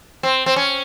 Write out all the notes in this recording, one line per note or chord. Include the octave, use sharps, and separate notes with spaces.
C4
C4
C#4